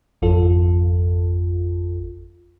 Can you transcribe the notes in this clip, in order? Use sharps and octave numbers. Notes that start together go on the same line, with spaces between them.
G#1 F2 F4 A4